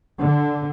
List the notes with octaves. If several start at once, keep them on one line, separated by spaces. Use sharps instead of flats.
D3